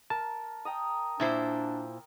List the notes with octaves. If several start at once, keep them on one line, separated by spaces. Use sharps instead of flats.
A#4 A5
G5 A#5 D#6
A#2 D4 E4 C5